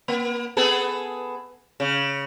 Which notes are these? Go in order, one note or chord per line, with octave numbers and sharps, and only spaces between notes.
A#3
B3 G#4 A4
C#3